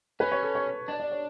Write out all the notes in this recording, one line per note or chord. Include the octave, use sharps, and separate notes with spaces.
C#4 B4
C#5
A4
C#5
D4 D5
D5
C#5